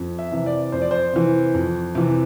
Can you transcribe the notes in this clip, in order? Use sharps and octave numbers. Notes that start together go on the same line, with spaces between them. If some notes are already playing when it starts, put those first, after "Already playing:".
Already playing: F2
E5
C3 E3
D5
F2 C5
D5
C5
C3 E3
F2
C3 E3